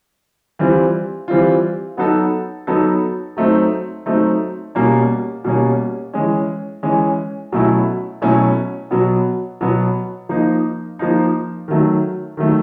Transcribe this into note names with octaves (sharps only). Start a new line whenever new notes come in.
E3 G3 C4 F4
E3 G3 C4 F4
F#3 B3 D#4 F#4 A4
F#3 B3 D#4 F#4 A4
F#3 A3 C4 D#4
F#3 A3 C4 D#4
B2 G3 A#3 C#4
B2 G3 A#3 C#4
E3 G#3 C#4
E3 G#3 C#4
B2 F#3 A3 C#4 E4
B2 F#3 A3 C#4 E4
B2 F#3 B3
B2 F#3 B3
F3 A#3 D#4
F3 A#3 D#4
D#3 F#3 A3
D#3 F#3 A3